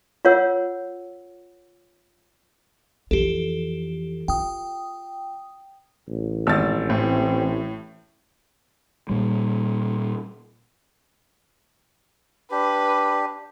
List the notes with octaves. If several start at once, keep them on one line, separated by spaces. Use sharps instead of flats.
F4 A#4 C#5 F#5 E6
F2 E3 G4 A4
F4 G5 D#6
A1
G#1 E6 A6
A2 C4
A#2 G3
D4 G4 B4